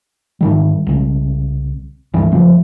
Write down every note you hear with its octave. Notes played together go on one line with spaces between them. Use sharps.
G#2 D#3 G3
C2 C#3
C#2 G2 E3 G3
F#1 C#3 F3 F#3